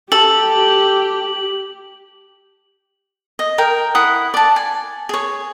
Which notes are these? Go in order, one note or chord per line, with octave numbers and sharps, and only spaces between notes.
G4 A4 F#7
D#5
A#4 G5
E4 F#5 D#6
D5 A5
G#5
G#4 C#5